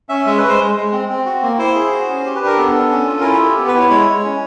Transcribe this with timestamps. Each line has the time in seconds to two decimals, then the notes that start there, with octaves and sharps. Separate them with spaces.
0.09 C#4 E5
0.26 G#3 E5
0.38 B4
0.43 G#3
0.48 C5
0.59 G#3
0.75 G#3
0.92 C4
1.09 C4
1.26 F#4
1.43 A#3
1.58 E4 C5
1.75 G#4
1.92 F#4
2.09 C#4
2.25 G4
2.36 B4
2.41 D4
2.46 A#4
2.57 B3 A4
2.75 D4
2.91 C#4
3.07 F4
3.20 A#4
3.24 E4 A4
3.41 G4
3.58 B3
3.68 B4
3.74 E4 C#5
3.90 G#3 C#5
4.07 G#3
4.24 C#4